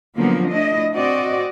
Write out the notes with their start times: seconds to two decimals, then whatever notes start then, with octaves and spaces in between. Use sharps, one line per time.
0.17 D3 F3 F#3 A#3 B3 C#4
0.51 A3 D4 E4 D#5
0.93 C4 F#4 D5 D#5